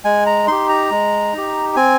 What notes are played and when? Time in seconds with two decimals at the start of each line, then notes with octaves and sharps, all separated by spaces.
0.04 G#3 G#5
0.26 A#5
0.47 D#4 G4 C6
0.69 A#5
0.91 G#3
1.33 D#4 G4
1.76 C4 G#5